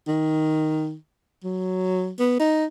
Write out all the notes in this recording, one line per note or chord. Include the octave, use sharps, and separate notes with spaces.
D#3
F#3
B3
D#4